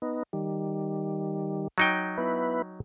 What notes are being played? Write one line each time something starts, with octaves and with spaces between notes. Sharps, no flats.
B3 D#4
D#3 G3
F#3 D#4 G5
B3 E4 B4